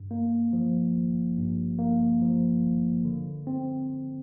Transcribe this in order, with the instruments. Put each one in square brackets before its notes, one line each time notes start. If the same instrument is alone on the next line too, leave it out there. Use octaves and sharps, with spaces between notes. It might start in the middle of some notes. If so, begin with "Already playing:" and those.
Already playing: [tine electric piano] G2
A#3
F3
G#1
G2
A#3
F3
G#1
D3
C4